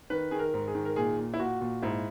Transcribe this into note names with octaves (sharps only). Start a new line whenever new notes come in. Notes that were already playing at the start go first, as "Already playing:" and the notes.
D#3 B4
D#3 G#4
A#4
G#2
G#4
D#3
A#4
A#2 G#4
A#2
E4
A#2 F#4
A#2 F#4
G#2 E4